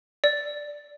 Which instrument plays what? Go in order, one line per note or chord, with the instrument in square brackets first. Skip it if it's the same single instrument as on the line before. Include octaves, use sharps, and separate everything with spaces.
[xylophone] D5